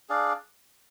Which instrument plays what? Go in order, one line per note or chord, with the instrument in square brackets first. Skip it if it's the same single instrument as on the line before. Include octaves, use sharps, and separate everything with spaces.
[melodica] D4 G#4 D5 F5